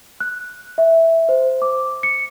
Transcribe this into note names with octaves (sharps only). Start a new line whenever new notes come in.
F#6
E5
C5
D6
C#7